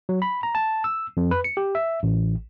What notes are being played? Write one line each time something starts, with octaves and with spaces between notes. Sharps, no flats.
F#3
B5
A#5
A5
E6
F2
B4
C#7
G4
E5
A1